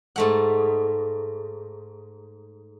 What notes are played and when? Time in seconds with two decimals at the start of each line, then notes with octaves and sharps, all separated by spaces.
0.16 G#2 A3 F#5